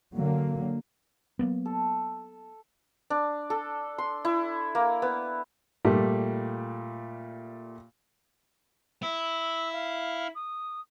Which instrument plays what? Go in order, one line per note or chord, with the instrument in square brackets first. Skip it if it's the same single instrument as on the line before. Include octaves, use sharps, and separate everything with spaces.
[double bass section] D3 F#3 A#3
[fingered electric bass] F#3 A#3 B3
[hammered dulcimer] A4
[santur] D4
A4
C6
E4
A#3
B3
[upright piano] A#2 G3 A3
[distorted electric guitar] E4 [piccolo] E6
[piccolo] F5
D#6